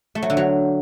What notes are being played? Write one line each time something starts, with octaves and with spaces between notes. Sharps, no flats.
A3
F#3
D3
F#3